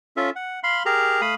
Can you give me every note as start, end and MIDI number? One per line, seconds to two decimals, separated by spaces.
0.17 0.30 61
0.17 0.30 65
0.17 0.30 69
0.17 0.30 76
0.36 0.60 78
0.63 0.83 77
0.63 0.83 83
0.63 0.83 84
0.86 1.21 67
0.86 1.21 68
0.86 1.21 70
0.86 1.21 82
1.21 1.35 57
1.21 1.35 77
1.21 1.35 83
1.21 1.35 87